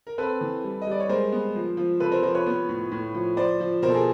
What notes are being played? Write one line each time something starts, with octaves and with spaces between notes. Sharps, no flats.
A#4
C4 A4 B4
E3
G3
D#5
G3 D5
C#5
G#3 A#4 C5
B3
F3
F3
C3 A4 B4
A#4 C5
F3 A#4 C5
B4 C#5
B3
A2
A2
F3
F3 C5 D5
F3
B2 A#4 C5
A4
G#4 A#4